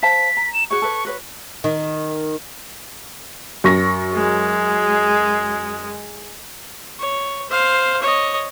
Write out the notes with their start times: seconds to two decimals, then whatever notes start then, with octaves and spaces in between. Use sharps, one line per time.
0.03 C5 F5 A5 B6
0.37 A#5
0.54 E7
0.71 F#4 G#4 C#5 C#6
0.82 A4 B4 C#5
1.05 F#4 B4 C#5
1.64 D#3
3.64 F#2 C#6 A#6
4.14 G#3
6.99 C#5
7.50 C5 F5
8.02 C#5 D#5